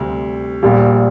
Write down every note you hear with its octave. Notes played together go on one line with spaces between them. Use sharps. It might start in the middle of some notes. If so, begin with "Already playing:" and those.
Already playing: D2 C3 G3 C4
A#1 A#2 G3